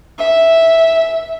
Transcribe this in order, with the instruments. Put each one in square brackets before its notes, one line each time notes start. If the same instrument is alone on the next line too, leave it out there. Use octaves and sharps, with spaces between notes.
[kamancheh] E5